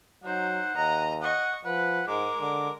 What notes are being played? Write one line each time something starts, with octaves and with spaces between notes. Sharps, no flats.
F#3 D#4 C5 F#5
D#2 D#5 A#5
D#5 F#5 C#6
F3 B4 F#5
G#2 G#3 A#4 D6
D3 D6